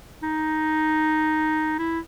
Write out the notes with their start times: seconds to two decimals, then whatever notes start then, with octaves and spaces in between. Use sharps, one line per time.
0.23 D#4
1.79 E4